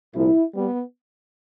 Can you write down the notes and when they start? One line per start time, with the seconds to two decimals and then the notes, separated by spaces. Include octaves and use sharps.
0.15 C2 A#2 F3 E4
0.53 G3 B3